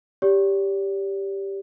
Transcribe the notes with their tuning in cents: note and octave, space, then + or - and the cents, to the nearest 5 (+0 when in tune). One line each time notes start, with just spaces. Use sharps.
G4 +5 D5 -45